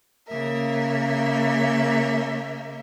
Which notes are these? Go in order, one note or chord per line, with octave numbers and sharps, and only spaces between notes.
C#3 A#3 A#4 E5